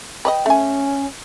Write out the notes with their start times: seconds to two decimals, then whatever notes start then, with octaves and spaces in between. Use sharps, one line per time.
0.25 B4 D5 D#5 G5
0.46 A3 C#4 G#5